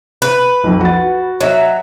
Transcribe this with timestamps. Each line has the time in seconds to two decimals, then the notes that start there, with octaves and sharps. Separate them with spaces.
0.22 B4
0.64 B1 F2
0.81 F#4 A6
1.41 F#3 C#5 D#5 E5